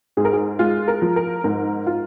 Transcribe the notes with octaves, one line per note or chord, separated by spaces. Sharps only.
G#2 G#4
A#4
G#4
G#3 F4
A#4
F3
A#4
G#2 A#4
F4